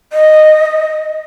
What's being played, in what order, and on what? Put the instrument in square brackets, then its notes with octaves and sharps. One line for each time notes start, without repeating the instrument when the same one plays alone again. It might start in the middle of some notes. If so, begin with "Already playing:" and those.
[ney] D#5